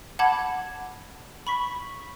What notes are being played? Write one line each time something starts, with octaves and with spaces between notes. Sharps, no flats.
F#5 A5 B5 D6 G#6
B5 C#6 B6